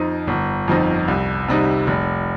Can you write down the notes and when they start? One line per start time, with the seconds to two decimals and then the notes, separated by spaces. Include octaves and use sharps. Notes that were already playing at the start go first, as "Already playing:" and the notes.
Already playing: F2 F3 D#4
0.27 G1
0.68 F2 F3 D#4
1.08 C2
1.48 C3 G3 D#4
1.87 F1